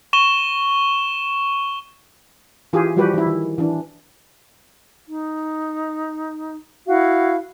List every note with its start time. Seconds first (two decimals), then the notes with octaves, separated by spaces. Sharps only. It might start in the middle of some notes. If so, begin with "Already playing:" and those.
0.13 C#6 E7 G7
2.73 E3 F4 G4 G#4
2.96 E3 F3 G3 F#4 G4 B4
3.14 E3 E4
3.26 D#3
3.58 E3 D4
5.08 D#4
6.87 E4 F#4 F5